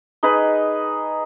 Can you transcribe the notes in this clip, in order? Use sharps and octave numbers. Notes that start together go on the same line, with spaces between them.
D#4 G#4 B4 B5